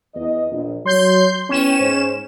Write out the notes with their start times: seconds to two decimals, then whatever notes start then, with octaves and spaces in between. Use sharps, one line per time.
0.15 E2 D#5
0.51 A#1
0.86 F#3 C#5 C6 G6
1.49 E2 C#4 G5 E7
1.79 G#2 C5